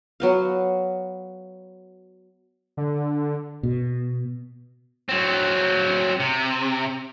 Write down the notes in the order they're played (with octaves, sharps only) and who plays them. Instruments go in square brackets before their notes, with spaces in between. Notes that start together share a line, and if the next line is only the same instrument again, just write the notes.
[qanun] F#3 B3 F5
[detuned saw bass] D3
[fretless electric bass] B2
[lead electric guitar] F#3 C4
C3